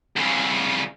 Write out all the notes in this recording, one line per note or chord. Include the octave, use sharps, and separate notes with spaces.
C2 C#3